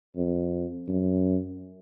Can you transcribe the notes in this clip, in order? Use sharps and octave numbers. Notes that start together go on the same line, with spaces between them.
F2
F#2